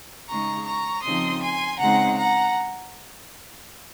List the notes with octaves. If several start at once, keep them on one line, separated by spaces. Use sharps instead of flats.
C#3 G#3 D#4 A#5 C#6
A#5 C#6
C#3 F3 C4 D#4 C6 D#6
G#5 C6
C#3 G#3 C4 D#4 F#5 A#5
F#5 A#5